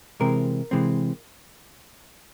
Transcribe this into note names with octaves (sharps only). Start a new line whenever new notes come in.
C3 E3 G#3 C4 A#4
C3 E3 G#3 C4